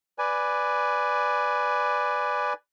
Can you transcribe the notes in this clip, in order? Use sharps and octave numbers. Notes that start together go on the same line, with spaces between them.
B4 D5 G#5